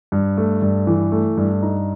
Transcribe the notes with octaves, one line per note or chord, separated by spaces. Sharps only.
G2
A3
G2
E3
A3
G2
D#4